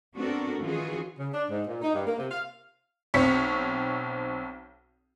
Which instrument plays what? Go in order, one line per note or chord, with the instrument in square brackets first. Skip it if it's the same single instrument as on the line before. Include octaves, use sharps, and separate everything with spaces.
[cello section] B3 C4 D4 F#4 A4 A#4
D#3 E3 C#4 F4 F#4 G#4
[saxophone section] C#3
D4
G#2
A#2
D#4
G2
A#3
C3
F5
[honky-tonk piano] B1 C4 C#5 B6 C#7